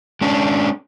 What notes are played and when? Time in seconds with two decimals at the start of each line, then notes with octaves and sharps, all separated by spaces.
0.21 G#3 C#4 D4